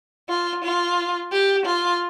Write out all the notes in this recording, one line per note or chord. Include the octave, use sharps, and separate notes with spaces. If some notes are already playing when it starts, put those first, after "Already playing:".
F4
F4
G4
F4